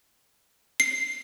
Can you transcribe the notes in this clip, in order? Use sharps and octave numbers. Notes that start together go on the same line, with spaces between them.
C7